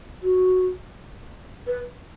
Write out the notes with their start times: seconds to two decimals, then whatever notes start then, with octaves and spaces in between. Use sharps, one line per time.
0.23 F#4
1.67 B4